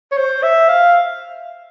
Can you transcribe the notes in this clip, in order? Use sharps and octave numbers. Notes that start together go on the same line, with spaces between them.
C#5
C5
E5
F5